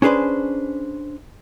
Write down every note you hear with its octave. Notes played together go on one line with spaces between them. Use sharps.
C#4 D4 G#4 B4 C5